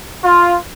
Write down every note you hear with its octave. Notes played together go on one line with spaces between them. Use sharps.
F4